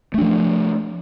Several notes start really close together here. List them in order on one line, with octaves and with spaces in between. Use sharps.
A3 D4 F3